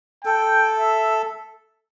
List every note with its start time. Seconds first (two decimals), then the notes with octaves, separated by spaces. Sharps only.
0.24 A4 G5
0.79 E5